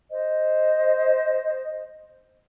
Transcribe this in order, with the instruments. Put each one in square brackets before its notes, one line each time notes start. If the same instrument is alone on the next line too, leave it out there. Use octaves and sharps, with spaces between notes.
[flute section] C5 D#5